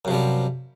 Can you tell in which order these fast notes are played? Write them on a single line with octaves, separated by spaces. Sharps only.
F#2 C3 F3 G3